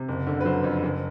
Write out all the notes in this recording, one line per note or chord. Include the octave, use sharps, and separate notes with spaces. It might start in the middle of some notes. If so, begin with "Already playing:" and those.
Already playing: C3
F#1
D3
B4
F#3 C5
F2
F#1